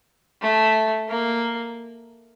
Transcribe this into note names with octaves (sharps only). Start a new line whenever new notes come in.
A3
A#3